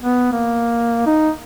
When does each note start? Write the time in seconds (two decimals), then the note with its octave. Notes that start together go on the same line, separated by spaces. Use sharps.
0.03 B3
0.32 A#3
1.06 D#4